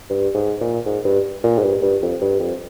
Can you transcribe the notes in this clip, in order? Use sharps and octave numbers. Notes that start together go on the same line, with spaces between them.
G2
G#2
A#2
G#2
G2
A#2
G#2
G2
G2
F2
G2
F2